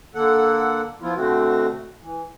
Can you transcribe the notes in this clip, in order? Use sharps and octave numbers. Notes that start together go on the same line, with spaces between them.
D3 A#3 A4 F#5
F3 B3 E4 F4
B2 D3 A3 C4 F#4
E3